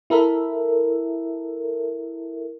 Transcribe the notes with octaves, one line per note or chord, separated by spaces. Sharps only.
E4 A4 A#4 E5